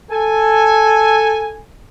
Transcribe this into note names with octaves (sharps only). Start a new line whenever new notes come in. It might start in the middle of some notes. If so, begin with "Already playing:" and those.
A4 G#5